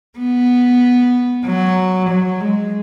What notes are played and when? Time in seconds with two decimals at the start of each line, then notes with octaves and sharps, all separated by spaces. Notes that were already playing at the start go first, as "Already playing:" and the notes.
0.19 B3
1.45 F#3
2.09 F#3
2.41 G#3